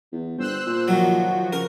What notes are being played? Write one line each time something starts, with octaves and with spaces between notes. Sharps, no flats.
E2
G1 C5 E6 F#6
A#2
D#3 F3 F#3 F#4
C#3 A#4